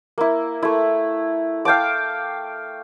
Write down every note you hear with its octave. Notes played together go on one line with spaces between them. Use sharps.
A#3 E4
A3 E4
F5 G5 A5 D6